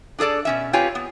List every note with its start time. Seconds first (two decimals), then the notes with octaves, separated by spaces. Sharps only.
0.19 D4 G#4 A4 D5
0.45 B2 C#4 E5
0.73 C4 F4 G4 B4 C#5 G#5
0.95 B3